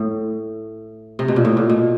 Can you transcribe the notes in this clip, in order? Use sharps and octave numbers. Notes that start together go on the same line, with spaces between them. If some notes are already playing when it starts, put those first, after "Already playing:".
Already playing: A2
C3
B2
A#2
A2
A#2
B2